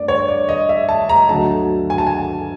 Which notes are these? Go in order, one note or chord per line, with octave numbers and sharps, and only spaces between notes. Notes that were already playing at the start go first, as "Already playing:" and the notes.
Already playing: G2 A3 D5
C#5
D5
D#5
E5
A5
A#5
D2 D3 F#3 A3 A5
G#5
A5
G#5